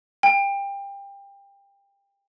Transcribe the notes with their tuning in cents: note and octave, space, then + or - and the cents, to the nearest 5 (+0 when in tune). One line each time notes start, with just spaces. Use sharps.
G5 +25